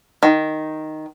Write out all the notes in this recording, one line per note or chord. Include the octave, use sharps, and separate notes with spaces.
D#3